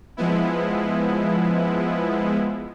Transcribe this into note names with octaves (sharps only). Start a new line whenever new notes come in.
F3 G#3 B3 E4